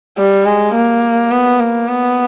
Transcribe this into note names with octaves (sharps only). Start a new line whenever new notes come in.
G3
G#3
A#3
B3
A#3
B3